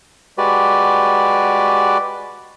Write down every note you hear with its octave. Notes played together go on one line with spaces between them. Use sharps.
G#3 F#4 G4 B4 D5